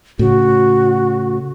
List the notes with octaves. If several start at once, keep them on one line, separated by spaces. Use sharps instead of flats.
A2 C#3 F#4